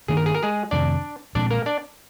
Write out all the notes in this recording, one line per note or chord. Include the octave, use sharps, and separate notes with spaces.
G2 D#3 A#3 D4 G#4
A#4
G#4
A#4
G#3 G#4
F2 C3 D#3 D4 D5
A#2 F3 G#3 C4 D4 D5
A#3 A#4
D4 D5